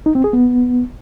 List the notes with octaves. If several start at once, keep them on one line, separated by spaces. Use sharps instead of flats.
D#4
C4
G#4
B3